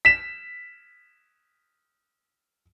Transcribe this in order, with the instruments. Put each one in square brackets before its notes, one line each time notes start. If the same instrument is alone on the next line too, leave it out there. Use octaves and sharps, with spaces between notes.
[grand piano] B6 E7